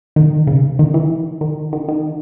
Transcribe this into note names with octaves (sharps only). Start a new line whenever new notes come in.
D#3
C#3
D#3
E3
D#3
D#3
D#3